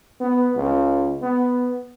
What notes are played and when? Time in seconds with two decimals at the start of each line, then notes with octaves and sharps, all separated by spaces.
0.20 B3
0.56 C#2
1.22 B3